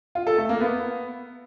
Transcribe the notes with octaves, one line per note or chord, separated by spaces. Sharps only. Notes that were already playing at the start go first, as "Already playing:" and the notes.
F4
A4
A3
A#3
B3